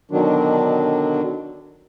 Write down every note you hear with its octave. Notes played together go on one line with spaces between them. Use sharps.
B2 D3 D#3 F#3 D4